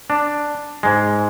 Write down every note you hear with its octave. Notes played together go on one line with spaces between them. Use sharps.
D4
G#2 G#3